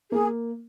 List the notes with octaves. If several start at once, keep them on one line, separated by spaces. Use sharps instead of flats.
A#3 G#4